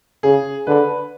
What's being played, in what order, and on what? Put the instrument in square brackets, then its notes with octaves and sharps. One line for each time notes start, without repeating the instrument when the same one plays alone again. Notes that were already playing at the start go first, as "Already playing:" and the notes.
[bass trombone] C#3 [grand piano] G#4
[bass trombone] D3 [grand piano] B4